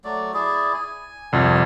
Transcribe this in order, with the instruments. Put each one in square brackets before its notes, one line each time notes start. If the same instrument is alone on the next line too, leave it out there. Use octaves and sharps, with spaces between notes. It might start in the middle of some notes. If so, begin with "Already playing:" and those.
[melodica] F#3 A3 D5
E4 G#4 D5
G#5
[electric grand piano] C2 F2